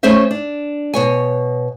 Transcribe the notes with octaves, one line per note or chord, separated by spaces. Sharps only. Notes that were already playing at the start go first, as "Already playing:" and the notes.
A3 C#4 G#4 C5 E5
D4
B2 C#5 G#5